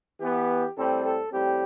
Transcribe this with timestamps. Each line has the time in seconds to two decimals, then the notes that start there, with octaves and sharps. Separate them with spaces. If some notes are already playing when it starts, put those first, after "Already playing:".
0.19 E3 B3 G4
0.75 A2 G3 C4 A4
1.04 A4
1.31 A2 G3 C4 G4